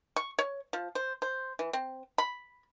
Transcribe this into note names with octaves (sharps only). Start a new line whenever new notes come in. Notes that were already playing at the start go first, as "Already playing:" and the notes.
C#6
C#5
F3
C5
C5
E3
C4
B5